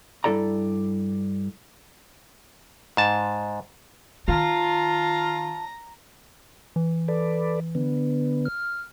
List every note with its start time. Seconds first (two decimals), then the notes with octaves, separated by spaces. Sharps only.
0.24 G2 E3 E4 A4 D5 A#5
2.97 G#2 A5
4.28 D#3 F4 A5 A#5
6.76 E3
7.08 A4 B4 D5
7.75 D3 B3
8.45 F6